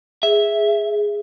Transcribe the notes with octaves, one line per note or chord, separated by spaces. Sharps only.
G#4 E5